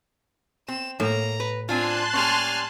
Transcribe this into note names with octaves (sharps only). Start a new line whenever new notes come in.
C4 E7
A2 A#3 A#5
B4
C4 D4 F4 G#5 A5 C6 F#6
G3 A#3 C#4 G#5 F6